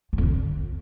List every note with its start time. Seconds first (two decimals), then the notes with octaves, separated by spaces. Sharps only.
0.13 F#2
0.18 F2
0.23 D3